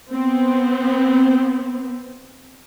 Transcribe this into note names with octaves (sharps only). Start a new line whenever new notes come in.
B3 C4